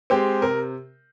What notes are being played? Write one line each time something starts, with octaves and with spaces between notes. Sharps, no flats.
G#3 C4 G4
C3 A#4